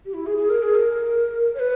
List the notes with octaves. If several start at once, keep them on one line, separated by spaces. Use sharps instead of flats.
G4
E4
G#4
G#4
A#4
G#4
A#4
C#5
B4